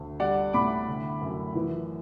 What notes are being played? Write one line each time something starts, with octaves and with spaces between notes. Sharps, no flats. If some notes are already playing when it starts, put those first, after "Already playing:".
Already playing: D2
G3 D5 F#5
A2 B5 D6
D3
F#2
E3